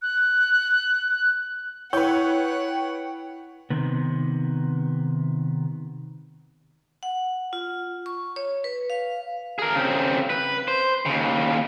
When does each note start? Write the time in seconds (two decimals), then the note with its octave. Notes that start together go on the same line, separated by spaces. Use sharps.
0.02 F#6
1.93 E4 B4 C#5 F#5 G5
3.70 C3 D#3 B3
7.03 F#5
7.53 F4
8.06 C#6
8.36 C#5
8.64 B4
8.90 F5
9.59 G#4 A#4
9.75 C#3 C4
10.30 B4
10.68 C5
11.06 D#2 C#3